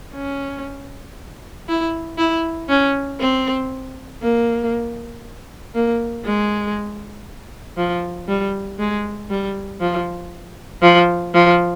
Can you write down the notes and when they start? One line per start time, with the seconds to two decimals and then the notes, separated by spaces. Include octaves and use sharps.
0.15 C#4
1.68 E4
2.18 E4
2.69 C#4
3.20 C4
4.22 A#3
5.75 A#3
6.25 G#3
7.77 F3
8.28 G3
8.79 G#3
9.30 G3
9.80 F3
10.82 F3
11.34 F3